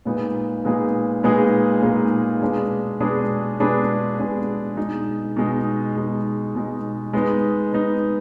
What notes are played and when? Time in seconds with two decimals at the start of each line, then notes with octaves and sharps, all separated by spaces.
0.05 A#2 G#3 B3 D#4 G#4
0.64 A#2 G#3 B3 D#4 G#4
1.23 A#2 G#3 B3 D#4 G#4
1.82 A#2 G#3 B3 D#4 G#4
2.42 B2 G#3 D4 G#4 B4
3.00 B2 G#3 D4 G#4 B4
3.60 B2 G#3 D4 G#4 B4
4.18 B2 G#3 D4 G#4 B4
4.77 B2 G#3 D#4
5.36 B2 G#3 D#4
5.96 B2 G#3 D#4
6.55 B2 G#3 D#4
7.13 G#3 B3 D#4
7.73 G#3 B3 D#4